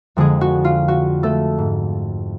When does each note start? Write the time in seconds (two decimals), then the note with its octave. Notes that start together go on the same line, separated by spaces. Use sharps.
0.17 F2 D3 G#3 G#4
0.41 F#4
0.65 F4
0.88 F#4
1.23 A3 A4
1.58 G#2